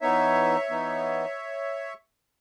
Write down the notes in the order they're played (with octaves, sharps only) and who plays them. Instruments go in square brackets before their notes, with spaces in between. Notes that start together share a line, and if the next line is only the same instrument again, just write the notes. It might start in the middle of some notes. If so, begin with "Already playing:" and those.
[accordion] E3 B3 D#4 C#5 E5
E3 B3 D#4